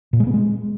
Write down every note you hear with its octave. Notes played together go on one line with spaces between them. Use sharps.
A#2
G#3
B3
G#3